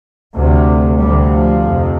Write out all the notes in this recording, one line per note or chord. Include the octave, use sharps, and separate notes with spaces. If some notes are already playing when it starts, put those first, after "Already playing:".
D2 C3
D2 C3 G3
F3
F2 C3